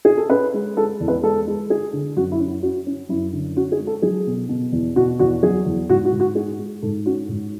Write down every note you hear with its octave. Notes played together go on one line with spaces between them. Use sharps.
G#4
A4
C#4 B4
G#3
G#3 A4
E2
B4
G#3 A4
G#3
G#3 G#4
D3
F#2 F#4
E4
C#4
E4
C#4 F#4
C#4
F#2 E4
D3
C#4 F#4
G#4
G#3
A4
F#3 G#4
B2
B2
E2
B2 F#4
E2 F#4
F#3 G#4
E2
G#2 F#4
F#4
G#2
F#4
G#3 G#4
G#3
G#2 A4
C#4 F#4
G#2